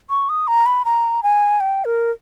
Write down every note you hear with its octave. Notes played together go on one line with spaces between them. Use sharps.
C#6
D#6
A#5
B5
A#5
G#5
G5
A#4